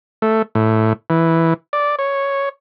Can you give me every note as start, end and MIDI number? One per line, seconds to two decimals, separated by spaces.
0.22 0.42 57
0.55 0.93 45
1.10 1.54 52
1.73 1.96 74
1.99 2.49 73